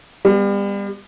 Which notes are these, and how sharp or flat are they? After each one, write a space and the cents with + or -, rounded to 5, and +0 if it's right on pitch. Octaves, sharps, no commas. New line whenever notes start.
G3 +35 B3 +0